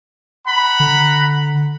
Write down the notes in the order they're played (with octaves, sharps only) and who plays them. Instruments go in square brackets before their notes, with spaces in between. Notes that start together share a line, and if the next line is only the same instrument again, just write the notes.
[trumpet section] F#5 A#5 B5
[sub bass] D3